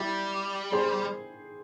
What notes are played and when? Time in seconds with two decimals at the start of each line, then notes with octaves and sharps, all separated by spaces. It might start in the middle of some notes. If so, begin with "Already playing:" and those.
Already playing: G3 E4 G4
0.72 G#4 C5